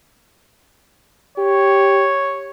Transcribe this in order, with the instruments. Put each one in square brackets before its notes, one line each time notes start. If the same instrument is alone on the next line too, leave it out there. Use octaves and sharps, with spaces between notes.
[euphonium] G4 [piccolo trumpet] C#5